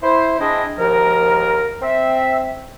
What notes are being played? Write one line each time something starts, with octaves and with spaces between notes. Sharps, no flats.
E4 C5
G#3 C4 D4 E4 D#5
D#2 G#2 F3 A#4
C4 E5